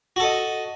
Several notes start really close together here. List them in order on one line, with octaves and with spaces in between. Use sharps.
F#4 A4 D#5